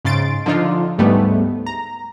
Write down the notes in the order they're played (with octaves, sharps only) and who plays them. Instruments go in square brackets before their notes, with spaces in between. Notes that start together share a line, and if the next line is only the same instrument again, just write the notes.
[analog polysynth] G#2 C#3 C6 A6 D7
D3 F3 D4 D#4 F4
D2 G#2 G3 A3 B3
A#5